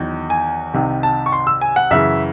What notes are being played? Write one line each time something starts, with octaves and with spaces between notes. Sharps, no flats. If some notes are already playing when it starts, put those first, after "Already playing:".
Already playing: E2 D#3 F#3
G#5
C2 C3 D#3
A5
C#6
C6
E6
G#5
F#5
F#2 C#3 E3 E5